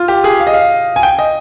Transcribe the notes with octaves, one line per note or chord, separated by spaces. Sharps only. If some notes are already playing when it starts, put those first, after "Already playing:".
Already playing: F4
G4
G#4
F5
D#5
F5
G#5
G5
D#5